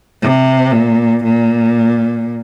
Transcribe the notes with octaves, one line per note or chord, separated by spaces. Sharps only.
C3
A#2
A#2